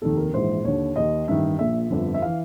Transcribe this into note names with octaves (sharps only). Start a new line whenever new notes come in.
F1 D#2 D#3 A4
A#4
A#1 G#2 E3 C5
D#2 D3 C#5
D#2 D#3 D#5
A1 G2 D#3 E5
A#1 A#2 E5
G1 F2 D3
E5
E3 F5